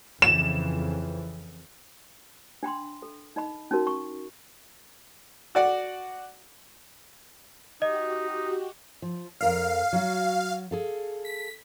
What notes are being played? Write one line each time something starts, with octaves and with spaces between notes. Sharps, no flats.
F2 C#3 E3 E7
D4 G5 B5 C6
A4
D#4 D#5 B5
C#4 D#4 F#4 A#4
C#6
F#4 D5 F#5
D#4 F#4 G4 D#5
F3
F2 A#4 D5 F5
F#3 F#4
G#4 A4 F5
B6